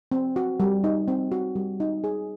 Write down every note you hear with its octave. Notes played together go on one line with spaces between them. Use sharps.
C4
F#4
G3
D#4
C4
F#4
G3
D#4
G#4